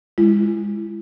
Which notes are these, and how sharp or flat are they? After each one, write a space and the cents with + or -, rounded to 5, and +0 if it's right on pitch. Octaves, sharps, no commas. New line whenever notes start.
G#3 -15 E4 +35